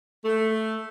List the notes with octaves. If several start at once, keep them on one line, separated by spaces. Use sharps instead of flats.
A3